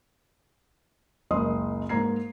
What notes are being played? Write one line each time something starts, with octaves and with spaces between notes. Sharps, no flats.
F#1 C#2 A#4 D#5 C6 D#6
G#2 A#3 A#5 G#6 C7